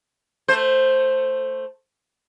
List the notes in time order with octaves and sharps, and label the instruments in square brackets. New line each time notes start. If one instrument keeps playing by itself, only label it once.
[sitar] A3 C5